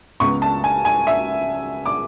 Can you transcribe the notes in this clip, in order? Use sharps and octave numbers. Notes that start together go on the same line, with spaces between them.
C#2 C#3 G#3 B3 C#6
A5
G#5
G#5
E5
D6